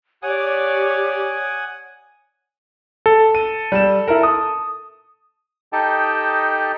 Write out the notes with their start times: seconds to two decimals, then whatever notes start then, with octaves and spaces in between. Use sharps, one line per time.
0.23 G4 C#5 D5 F#5 G#5 D#6
3.06 A4
3.35 D#7
3.72 G3 E7
4.08 E4 A#4
4.23 D#6
5.73 D#4 G4 A4 D#5 G5 A5